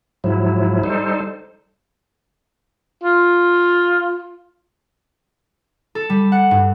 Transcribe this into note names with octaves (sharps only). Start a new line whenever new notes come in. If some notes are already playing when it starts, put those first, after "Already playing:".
G#2 F3 F#3 E4
G3 D#4 A4 C5
F4
A4
G3
F#5
G2